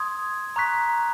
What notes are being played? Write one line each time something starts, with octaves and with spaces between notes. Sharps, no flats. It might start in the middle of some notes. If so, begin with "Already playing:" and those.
Already playing: C6 D#6 G#6
A#5 C#6 F#6 B6